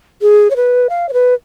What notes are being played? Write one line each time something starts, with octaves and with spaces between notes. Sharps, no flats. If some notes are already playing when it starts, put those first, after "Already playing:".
G#4
C#5
B4
F5
C#5
B4